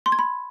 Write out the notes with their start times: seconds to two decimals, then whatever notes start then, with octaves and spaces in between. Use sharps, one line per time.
0.06 C6
0.12 G#6
0.19 B5